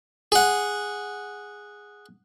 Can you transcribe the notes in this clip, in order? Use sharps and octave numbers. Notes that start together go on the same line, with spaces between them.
G#4 F#5